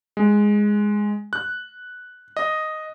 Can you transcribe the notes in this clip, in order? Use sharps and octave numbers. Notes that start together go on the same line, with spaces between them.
G#3
F#6
D#5